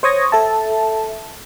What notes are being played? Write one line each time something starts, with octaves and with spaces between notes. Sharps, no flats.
C5 C#5 C#6 D#6 G#6 A#6
A4 E5 A5